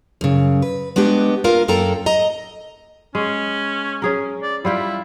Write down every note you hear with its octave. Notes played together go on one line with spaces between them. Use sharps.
F#2 C#3
B4
G#3 B3 D4 F#4 G4
A#3 F4 A#4 F5
F#2 A#3 A4 G5 A#5
D#5 A#5
G#3 C#4
C#4 G#4 A#4
D5
G3 E4 F4 G5